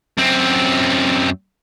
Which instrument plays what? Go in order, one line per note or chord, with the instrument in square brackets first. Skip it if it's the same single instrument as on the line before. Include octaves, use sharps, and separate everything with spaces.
[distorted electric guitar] F#2 C4